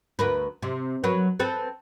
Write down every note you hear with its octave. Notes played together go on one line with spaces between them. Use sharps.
D2 A#4 B4
C3
F#3 A#4 B4
C4 A4 B4